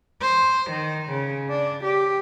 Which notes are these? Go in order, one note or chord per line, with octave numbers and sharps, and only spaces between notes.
C5
D#3
C#3
D4
G4